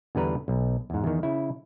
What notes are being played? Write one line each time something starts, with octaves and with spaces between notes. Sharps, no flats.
E2 D3 G3 B4 A#5
B1
E2 G#2
E2 D#3
C#3 E4